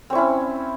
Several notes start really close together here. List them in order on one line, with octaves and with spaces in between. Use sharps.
C4 C#5 E4 C#4